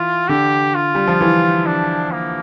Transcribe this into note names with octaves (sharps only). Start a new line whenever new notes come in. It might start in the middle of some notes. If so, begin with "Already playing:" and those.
Already playing: E3 F4
D3 G4
F4
G3
F3
E3
D4
A#3